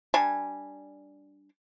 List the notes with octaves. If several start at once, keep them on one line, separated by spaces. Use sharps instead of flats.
G3 D4 G#5